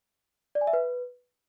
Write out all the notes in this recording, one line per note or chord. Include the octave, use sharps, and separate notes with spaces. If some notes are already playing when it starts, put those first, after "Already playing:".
D5
G#5
E5
B4